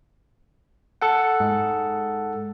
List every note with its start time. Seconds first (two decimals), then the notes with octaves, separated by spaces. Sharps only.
1.02 A4 F#5
1.40 G#2